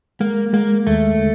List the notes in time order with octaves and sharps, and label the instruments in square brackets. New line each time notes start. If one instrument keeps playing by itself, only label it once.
[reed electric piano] G#3 [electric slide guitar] A#3
[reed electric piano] G#3 [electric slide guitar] A#3
[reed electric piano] D#2 [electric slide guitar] A3
[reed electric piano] D3